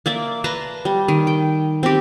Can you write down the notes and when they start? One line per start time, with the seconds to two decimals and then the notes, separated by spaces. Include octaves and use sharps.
0.06 A#3 D5 E5
0.44 B4 A5 A#5 C6
0.85 G3
1.08 D#3
1.27 G5
1.83 C4 G4